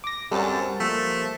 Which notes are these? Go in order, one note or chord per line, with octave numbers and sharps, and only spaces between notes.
D6 A#6
F#2 G3 C4 G4 A4 A6
F3 A3 A#3